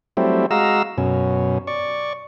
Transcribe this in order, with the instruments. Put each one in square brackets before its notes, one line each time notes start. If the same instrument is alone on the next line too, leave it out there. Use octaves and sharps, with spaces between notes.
[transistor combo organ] F#3 G3 A3 C4 E4
G#3 F#4 D#5 F5 A#5 E6
F#2 B2 C#4
D5 C#6